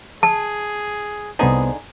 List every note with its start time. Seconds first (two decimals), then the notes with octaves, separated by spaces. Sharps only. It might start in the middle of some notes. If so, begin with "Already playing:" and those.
0.23 G#4 A5
1.39 C2 D3 B3 D#4 G#4 C5